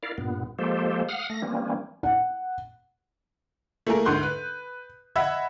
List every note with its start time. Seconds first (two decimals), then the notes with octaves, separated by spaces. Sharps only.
0.03 E4 A#4 D5 F5
0.18 G2 A#2 B3
0.59 F3 G#3 A#3 G4 A4 C5
1.09 F5 F#5 D#6 F6
1.30 A3 A#6
1.42 E3 G3 A#3 C4 C#4
2.03 F#5
3.87 A3 A#3 E4 G#4 A#4
4.05 D2 G#2 D3 C6 F#6 G6
4.23 B4
5.16 D#5 E5 F#5 B5 E6 G#6